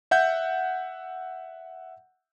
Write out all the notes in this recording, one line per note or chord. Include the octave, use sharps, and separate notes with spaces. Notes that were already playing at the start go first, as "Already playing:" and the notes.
E5 F#5 G6